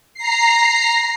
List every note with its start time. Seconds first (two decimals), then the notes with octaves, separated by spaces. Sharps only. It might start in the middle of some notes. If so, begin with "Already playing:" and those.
0.14 A#5 C7